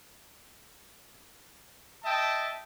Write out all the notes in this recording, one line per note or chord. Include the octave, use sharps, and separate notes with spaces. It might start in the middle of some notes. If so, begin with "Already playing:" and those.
D#5 E5 G5 A5